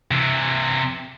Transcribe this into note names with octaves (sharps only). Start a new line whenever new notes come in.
C3 E3